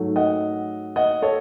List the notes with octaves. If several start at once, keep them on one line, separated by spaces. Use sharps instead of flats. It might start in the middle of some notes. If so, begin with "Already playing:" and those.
Already playing: G#2 F#3 A3
D#5 F#5
D#5 F#5
A4 C#5